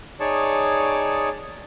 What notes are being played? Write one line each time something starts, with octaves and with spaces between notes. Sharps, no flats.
D#4 G#4 C#5 D5 A5 C#6